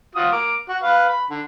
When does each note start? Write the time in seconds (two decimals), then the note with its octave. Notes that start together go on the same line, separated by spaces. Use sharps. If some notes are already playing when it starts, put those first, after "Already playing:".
0.15 F4 F#4 D#6
0.32 A#4 D6
0.69 F#4
0.83 B4 F5
1.09 B5
1.30 D3